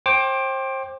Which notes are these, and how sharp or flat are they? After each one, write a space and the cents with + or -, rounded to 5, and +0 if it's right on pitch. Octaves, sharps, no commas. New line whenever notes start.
C5 +30 G5 +0 D6 +5